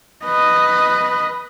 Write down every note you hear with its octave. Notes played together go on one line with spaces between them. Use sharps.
B4 D#5